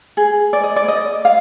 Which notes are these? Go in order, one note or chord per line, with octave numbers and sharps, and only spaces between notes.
G#4
D5
D#5
D5
D#5
F5